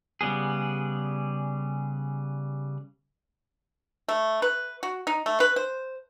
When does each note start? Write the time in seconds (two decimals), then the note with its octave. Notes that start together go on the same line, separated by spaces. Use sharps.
0.21 C#3 G3 B3 G#4
4.08 A3
4.42 B4
4.83 F#4
5.07 D#4
5.26 A3
5.40 B4
5.56 C5